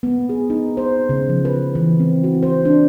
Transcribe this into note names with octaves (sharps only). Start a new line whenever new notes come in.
B3
G#4
D#4
C5
C#3
F3
B4
E3
C4
F#4
C5
D4